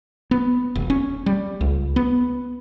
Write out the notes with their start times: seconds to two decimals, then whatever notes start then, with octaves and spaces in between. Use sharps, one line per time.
0.31 B3
0.75 E1
0.90 C#4
1.26 G3
1.61 C#2
1.96 B3